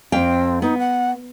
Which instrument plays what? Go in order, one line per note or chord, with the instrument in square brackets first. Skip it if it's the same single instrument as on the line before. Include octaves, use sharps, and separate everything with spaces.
[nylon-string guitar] F2 F5 G5 [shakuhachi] C4
[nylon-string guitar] B3 [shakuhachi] D#4
[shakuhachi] F#5